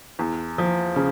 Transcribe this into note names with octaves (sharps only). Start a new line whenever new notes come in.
E2
F3
C#3